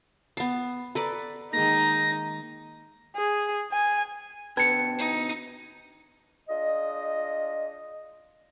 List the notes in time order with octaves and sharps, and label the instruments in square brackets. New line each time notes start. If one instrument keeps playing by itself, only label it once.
[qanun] B3 A5 [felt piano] C7
[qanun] A4 B4 D5 [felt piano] A#5 B5
[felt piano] D#3 G#3 A#3 [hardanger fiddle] D#4 [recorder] A#6
[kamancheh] G#4
G#5
[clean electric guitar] B2 D3 [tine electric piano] B4 G5 A5 [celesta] G#6 C#7
[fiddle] D#4
[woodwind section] D4 F4 G#4 D#5